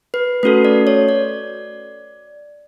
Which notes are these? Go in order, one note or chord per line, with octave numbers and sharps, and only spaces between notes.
B4
A3 C#4 F#4 A4 B4
D5
C#5
D5